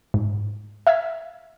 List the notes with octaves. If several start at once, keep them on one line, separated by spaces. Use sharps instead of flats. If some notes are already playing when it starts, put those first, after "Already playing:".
G#2
E5 F5 E6 G#6 B6